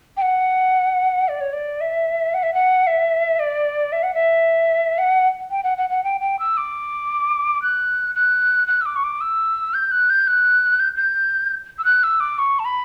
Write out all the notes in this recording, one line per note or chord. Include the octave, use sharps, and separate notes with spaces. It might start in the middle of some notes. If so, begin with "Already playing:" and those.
G5
F#5
D5
C#5
D5
E5
F#5
E5
F#5
E5
D5
E5
F#5
E5
F#5
G5
F#5
F#5
F#5
G5
G5
E6
D6
F#6
F#6
F#6
E6
D6
C#6
D6
E6
G6
F#6
G6
F#6
G6
G6
E6
F#6
E6
D6
C#6
A5
B5